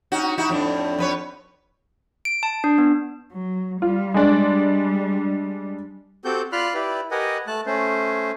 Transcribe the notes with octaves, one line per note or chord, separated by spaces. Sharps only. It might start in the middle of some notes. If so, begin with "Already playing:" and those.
C#4 D#4 F#4
D#4 E4 F#4
F2 A2 D4
F2 B4 C#5
D7
A5
D4
B3
F#3
G3 F4
G#3 D4
C4 F#4 G4 A4 G6
F4 D5 B5 C6 F6 F#6
E4 G4 B4 D5
G4 A#4 B4 D#5 F#5 G#5
A3 A5 F#6
A3 C#4 C5